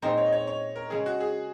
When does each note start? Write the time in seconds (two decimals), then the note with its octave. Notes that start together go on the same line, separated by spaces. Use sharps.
0.02 A#2 G#3 C4 D#4 C5
0.18 C#5
0.26 D#5
0.32 C#5
0.47 C#5
0.76 A#4
0.90 C#3 G#3 C#4 G#4
1.06 F#4
1.20 G#4